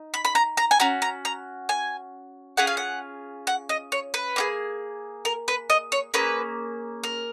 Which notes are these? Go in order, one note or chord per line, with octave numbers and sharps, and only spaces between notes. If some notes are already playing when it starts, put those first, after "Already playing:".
Already playing: D#4
B5
B5
A#5
A#5
G#5
C#4 F#4 A#5
A#5
A#5
G#5
C#4 F4 G#4 F#5
F5
F#5
F#5
D#5
C#5
B4
A#3 F4 G#4
A#4
B4
D#5
C#5
A#3 C#4 G#4 B4
A#4